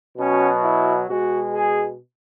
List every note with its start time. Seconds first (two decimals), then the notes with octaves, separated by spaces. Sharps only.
0.18 B2 F#3 C#4
0.63 E4
1.08 B2 G#3 F#4
1.53 G#4